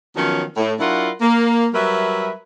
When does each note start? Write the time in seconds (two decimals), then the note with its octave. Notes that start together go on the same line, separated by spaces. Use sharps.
0.17 D#3 F3 F#3 B3 C#4 D#4
0.57 A2
0.80 F#3 D4 E4 F4 A#4 F#5
1.21 A#3
1.74 F#3 G3 A#4 B4 E5